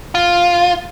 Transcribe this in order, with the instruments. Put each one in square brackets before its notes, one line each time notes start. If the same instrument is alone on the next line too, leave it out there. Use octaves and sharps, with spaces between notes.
[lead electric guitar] F4